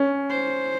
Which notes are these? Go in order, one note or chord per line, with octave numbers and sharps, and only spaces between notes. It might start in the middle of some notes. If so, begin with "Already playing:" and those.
Already playing: C#4
C5